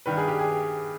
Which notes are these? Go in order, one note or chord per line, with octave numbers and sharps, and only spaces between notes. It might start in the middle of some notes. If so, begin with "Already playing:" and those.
G2 D#3 B4
G#4
G4
G#4